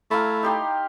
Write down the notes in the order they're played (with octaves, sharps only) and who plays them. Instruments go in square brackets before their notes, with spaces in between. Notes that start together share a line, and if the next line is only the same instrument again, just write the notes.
[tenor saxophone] A3 [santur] E4 F5 A#5
[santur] D#4 G4 C6